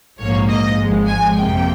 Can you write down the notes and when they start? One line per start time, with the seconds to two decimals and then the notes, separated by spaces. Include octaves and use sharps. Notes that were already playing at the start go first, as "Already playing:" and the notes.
0.18 A#1 G#2 F3 A#3 C#5
0.48 D#5
0.78 G#1 G#2 F3 G#3
1.08 G#5
1.37 F2 C3 F3 A#3 G5